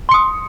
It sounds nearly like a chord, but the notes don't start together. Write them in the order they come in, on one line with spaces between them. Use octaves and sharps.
C6 C#7 D#6